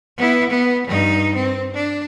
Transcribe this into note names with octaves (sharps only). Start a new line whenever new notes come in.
B3 E4
B3
G2 D#4
C4
D4